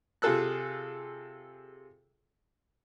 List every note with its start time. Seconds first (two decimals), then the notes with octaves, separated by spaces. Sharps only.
0.22 C3 F4 G#4 A4 E6 F#6